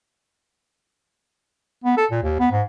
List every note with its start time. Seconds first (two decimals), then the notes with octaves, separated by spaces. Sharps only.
1.84 B3
1.97 A4
2.11 A#2
2.23 D#2
2.39 B3
2.52 G#2